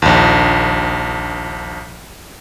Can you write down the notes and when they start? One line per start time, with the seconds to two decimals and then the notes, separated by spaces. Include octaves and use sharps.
0.02 A#1 D#2